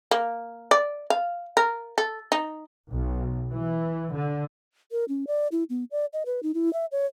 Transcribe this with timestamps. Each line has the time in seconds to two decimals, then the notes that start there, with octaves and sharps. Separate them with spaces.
0.11 A#3
0.71 D5
1.10 F5
1.57 A#4
1.98 A4
2.32 D#4
2.91 B1
3.50 E3
4.12 D3
4.92 A#4
5.09 C#4
5.27 D5
5.52 E4
5.70 B3
5.91 D5
6.13 D#5
6.26 B4
6.43 D#4
6.54 E4
6.73 E5
6.92 C#5